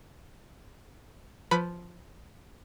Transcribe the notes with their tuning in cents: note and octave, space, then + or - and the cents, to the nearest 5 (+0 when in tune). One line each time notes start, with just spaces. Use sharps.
F3 +0 B4 +20 B5 +0